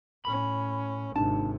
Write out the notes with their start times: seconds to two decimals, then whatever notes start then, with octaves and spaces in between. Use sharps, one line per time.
0.25 A2 C#4 B5
1.16 G#1 C3 D4 D#4 A5